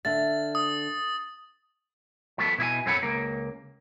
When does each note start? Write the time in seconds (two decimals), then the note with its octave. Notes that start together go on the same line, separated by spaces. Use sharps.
0.05 D3 E5 F5 A6
0.55 D#6
2.38 F3 A3 B3
2.58 B2 E4 D#5 G#5
2.86 F#2 C4 A4 C#5 F#5 B5
3.03 C#2 A#3